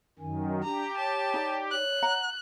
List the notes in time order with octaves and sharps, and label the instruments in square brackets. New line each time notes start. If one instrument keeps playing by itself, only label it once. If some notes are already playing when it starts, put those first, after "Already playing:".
[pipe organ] F#2 D#3 [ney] G#5
[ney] D4 [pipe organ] G4 [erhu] A#5
[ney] C#5 [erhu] A5
[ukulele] D#4 D5
[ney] C#5 [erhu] F#6
[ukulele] F#5 A#5